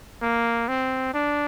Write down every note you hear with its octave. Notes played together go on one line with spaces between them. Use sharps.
A#3
C4
D4